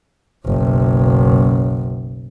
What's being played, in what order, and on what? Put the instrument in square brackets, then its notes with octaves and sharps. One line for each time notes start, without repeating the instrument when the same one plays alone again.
[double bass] F#1 B1